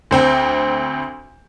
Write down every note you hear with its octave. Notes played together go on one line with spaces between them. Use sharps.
D2 C4 G5